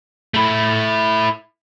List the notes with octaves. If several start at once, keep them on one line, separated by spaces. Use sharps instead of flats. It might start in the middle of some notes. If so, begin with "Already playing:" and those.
A3 E4